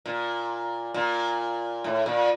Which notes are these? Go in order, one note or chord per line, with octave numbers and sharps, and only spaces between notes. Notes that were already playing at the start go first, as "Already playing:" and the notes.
A#2
A#2
A2
A#2